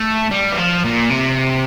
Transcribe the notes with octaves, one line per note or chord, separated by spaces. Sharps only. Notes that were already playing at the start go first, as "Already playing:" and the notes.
Already playing: A3
G3
E3
F3
A#2
C3